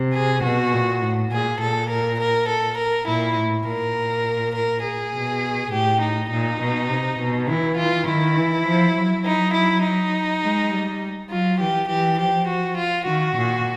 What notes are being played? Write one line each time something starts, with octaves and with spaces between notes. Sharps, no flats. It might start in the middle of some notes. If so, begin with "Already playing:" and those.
Already playing: C3
G#4
B2 F#4
A#2
A2
A#2 G#4
A#2 A4
A#4
A#4
A4
A#4
A#2 E4
A2
A#2 A#4
A#4
G#4
B2
A2 G4
D#4
A#2 D#4
B2
C3
B2
E3 E4
F4
D#3 E4
E3
F3
F#3
D#4
E4
D#4
G#3
G3
F#3 F4
E3 G4
E3 G4
F3 G4
F#4
F4
D#3 F#4
A#2